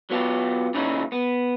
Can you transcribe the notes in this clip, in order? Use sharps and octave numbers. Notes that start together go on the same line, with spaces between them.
F#3 B3 F4 G4
A#2 C#3 C#4 D#4 E4
B3